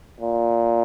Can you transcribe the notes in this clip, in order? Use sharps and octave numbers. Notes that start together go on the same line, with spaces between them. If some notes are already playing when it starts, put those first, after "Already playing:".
A#2